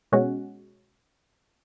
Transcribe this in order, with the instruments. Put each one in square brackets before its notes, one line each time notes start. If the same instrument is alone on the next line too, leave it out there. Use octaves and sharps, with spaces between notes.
[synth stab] B2 G#3 C#4 F#4